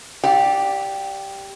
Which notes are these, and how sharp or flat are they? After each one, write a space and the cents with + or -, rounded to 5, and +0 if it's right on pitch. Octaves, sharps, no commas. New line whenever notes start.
G4 +0 D5 -10 F5 +45